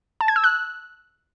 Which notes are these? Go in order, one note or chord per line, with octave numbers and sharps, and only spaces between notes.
A5
G#6
E6
F#6